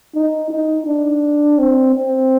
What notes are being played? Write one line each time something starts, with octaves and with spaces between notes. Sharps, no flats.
D#4
D#4
D4
C4
C4